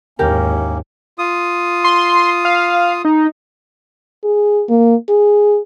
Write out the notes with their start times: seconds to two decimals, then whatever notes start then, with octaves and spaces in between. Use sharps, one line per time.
0.19 D#2 G#2 A#3 C#4 E4 G4 A#4
1.19 F4 D#6
1.84 C6
2.45 F5
3.05 D#4
4.24 G#4
4.69 A#3
5.09 G#4